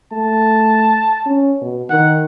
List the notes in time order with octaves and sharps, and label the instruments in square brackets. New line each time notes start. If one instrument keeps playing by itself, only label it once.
[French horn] A3 [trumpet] A5
[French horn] C#4
B2
[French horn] D#3 [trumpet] F#5